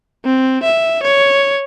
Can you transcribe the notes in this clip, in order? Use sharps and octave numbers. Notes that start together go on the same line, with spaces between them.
C4
E5
C#5